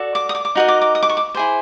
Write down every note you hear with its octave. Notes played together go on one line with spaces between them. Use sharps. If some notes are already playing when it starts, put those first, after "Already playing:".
Already playing: F#4 A4 D5
D6
D#6
D6
D6
D#4 F#4 A#4 D#5
D6
D6
D#6
D6
C#6
D6
E4 G#4 C5